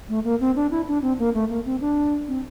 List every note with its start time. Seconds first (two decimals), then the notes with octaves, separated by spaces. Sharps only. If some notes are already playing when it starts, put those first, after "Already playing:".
0.09 A3
0.24 A#3
0.40 C4
0.56 D4
0.71 E4
0.88 D4
1.02 C4
1.19 A#3
1.34 A3
1.49 A#3
1.65 C4
1.81 D4
2.28 C4